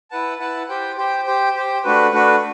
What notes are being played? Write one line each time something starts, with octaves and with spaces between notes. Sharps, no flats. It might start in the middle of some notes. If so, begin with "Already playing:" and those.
E4 B4 F#5 A5
E4 B4 F#5 A5
G4 C5 G5
G4 C5 G5
G4 C5 G5
G4 C5 G5
A3 D4 F#4 B4
A3 D4 F#4 B4